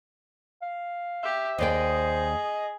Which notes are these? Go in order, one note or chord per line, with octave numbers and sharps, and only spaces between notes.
F5
G4 E5
D#2 G#4 C5 D5 D#5 G5